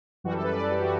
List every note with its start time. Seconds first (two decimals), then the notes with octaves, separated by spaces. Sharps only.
0.24 F#2 E3 G3 F#4
0.34 A4
0.44 B4
0.53 D5
0.62 A4
0.72 G4
0.81 F#4